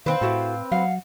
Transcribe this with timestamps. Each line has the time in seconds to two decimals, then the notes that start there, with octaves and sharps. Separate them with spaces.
0.06 D#3 C4 B4 F5
0.21 A2 E4 F#4 A4
0.72 F#3 F5 F#5